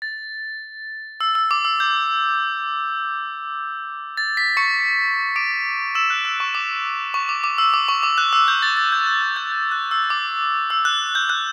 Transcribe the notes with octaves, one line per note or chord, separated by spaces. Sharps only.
A6
E6
E6
D6
E6
G6
A6
B6
C#6 C#7
D6 D7
E6 E7
F#6
E6
C#6
D6
C#6
D6
D6
E6
D6
C#6
D6
F#6
E6
G6
A6
A6
G6
F#6
F#6
G6
G6
F#6
E6
D6
E6
F#6
G6
F#6